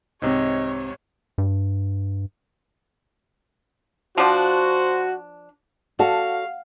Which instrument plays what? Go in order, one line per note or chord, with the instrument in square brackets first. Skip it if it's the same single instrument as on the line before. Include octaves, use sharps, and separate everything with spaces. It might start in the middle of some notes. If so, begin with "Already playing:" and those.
[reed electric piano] C2 C4 [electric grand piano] G#2 C3 [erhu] C#5 [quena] D#5
[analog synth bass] G2
[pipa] F3 D4 [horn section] F#4 [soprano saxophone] C5
[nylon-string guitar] F#4 [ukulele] A4 D5 A5 [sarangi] F5